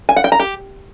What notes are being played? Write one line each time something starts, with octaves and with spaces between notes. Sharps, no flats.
G#5
F#5
G5
A#5
G4